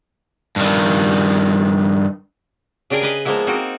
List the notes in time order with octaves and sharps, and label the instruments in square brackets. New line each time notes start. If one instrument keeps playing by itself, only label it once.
[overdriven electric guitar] G2 D#3
[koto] C#3 D4 G4 G#4 A#4 G#5
G#4 B4 D#5
F3 G#3 A#3 B3 E4
A#3 C4 D#4 F#4